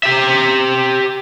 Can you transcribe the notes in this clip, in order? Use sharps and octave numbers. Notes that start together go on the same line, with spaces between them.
G4 E5